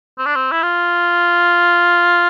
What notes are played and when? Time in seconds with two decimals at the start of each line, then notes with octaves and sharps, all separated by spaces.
0.18 C4
0.26 D4
0.36 C4
0.52 E4
0.63 F4